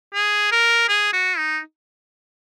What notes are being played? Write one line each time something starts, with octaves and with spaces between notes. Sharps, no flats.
G#4
A#4
G#4
F#4
D#4